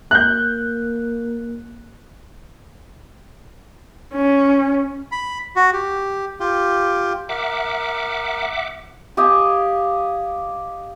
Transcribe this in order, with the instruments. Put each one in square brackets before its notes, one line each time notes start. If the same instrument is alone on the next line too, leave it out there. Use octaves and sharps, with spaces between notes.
[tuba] A#3 [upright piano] F#6 G6
[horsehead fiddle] C#4
[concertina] B5
F#4
G4
F4 G4
[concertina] A#4 [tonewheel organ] E5 F#5 D6
[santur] G4 D#5 F5 G#5